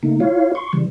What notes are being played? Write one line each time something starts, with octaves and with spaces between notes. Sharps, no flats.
C#3 A3 A#3 D#4
E4 F4 C#5 F5
C6 C#6
C#3 E3 G3